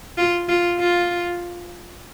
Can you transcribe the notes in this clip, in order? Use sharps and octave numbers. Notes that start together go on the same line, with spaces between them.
F4
F4
F4